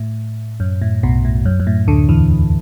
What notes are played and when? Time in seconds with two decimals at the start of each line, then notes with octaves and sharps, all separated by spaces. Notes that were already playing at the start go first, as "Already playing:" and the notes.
Already playing: A2
0.60 F#2
0.82 A2
1.03 B1 B2
1.25 A2
1.45 F#2
1.60 F#2
1.67 A2
1.87 D2 D3
2.09 E2 E3